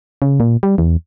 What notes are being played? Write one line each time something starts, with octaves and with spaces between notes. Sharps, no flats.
C#3
A#2
G3
E2